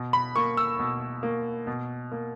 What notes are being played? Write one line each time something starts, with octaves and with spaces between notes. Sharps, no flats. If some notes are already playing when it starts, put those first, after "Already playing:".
Already playing: B2
B5
A#3 C#6
E6
B2
A#3
B2
A#3